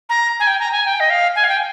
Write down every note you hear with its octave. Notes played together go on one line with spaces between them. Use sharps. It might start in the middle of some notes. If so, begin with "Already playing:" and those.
A#5
G#5
G5
A#5
G#5
G5
D#5
F5
G#5
F5
G5